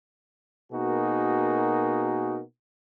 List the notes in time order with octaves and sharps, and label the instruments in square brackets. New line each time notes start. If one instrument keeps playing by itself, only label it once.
[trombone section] B2 A#3 D#4 F#4 G#4 A#4